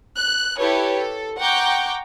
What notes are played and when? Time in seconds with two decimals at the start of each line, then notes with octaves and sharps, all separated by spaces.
0.15 F#6
0.58 E4 G4 A4 B4 C#5
0.98 A4
1.38 F#5 G5 A#5 C#6 D6 G6